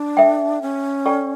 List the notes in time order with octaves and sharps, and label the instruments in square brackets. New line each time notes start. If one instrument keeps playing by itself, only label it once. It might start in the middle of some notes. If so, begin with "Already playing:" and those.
Already playing: [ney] D4
[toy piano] A4 E5 G5
[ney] C#4
[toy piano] A4 D5 G5 C#6